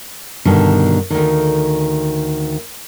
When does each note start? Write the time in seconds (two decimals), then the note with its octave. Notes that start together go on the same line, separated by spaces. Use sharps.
0.45 G2 B2 D3 D#3
1.10 D2 D#3